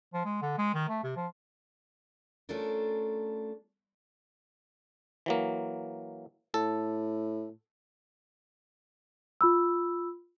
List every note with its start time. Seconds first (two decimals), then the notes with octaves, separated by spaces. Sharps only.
0.13 F3
0.25 G#3
0.42 D3
0.58 G#3
0.74 D#3
0.89 A3
1.03 C3
1.16 F3
2.49 A3 C#4 D4 F4 A4 A#4
5.26 E3 F#3 A#3
6.54 A2 A4
9.41 F4 B5 E6